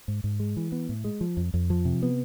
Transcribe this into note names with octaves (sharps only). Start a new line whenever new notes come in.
G#2
G#2
G#3
E3
B3
A2
G#3
F3
F2
F2
F3
C3
B3